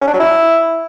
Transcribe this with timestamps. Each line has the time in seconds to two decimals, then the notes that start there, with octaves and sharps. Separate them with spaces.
0.01 C#4
0.07 D4
0.14 F#3
0.20 E4